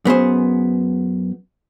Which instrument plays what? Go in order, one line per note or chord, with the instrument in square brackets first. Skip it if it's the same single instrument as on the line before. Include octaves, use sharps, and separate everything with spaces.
[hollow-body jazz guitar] F#2 B3 G#4 C5